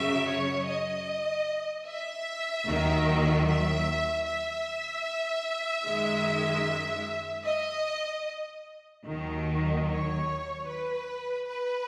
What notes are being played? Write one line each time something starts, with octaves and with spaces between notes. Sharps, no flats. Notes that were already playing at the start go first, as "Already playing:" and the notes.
Already playing: F#2 C#3 F#3 E5
C#5
D#5
E5
D#2 D#3 F#3
E5
E5
F#2 D#3 G#3
D#5
D#2 D#3 F#3
C#5
B4
B4